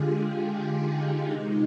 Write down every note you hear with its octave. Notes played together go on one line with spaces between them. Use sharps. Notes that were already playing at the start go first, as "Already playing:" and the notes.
Already playing: D3 G#3 F4 G4 G#4
G4
F4
D#4
C3 D#3 G#3